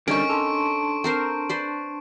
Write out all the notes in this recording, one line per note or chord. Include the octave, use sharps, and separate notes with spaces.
D3 G3 C#4 D#4 A#4 C#6 D7
D4 A4 A5 C6
C4 A#4 C5
B4 C5 D5